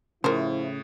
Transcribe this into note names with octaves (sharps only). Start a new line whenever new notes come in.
A2 C#3 F3 E4 A#4 C5